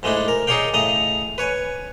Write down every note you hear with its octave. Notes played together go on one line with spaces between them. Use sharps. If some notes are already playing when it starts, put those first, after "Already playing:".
G#2 G#3 A3 D4 E4
A#4
D#4 G#4 C#5 D5 F5 G5
A2 C#3 D#5 A#5
B4 C#5 G#5